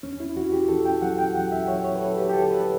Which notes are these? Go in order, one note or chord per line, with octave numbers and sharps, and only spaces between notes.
E2 C#4
E4
E2 F#4
G4
E2 A4
G5
F#3 F#5
G5
E2 F#5
E5
F#3 C#5
C#5
B4
E2 A4
G4
G4
D3 A4
B4